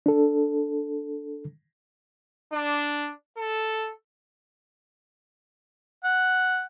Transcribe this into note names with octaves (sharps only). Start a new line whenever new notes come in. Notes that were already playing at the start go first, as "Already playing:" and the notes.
D4 A4
D4
A4
F#5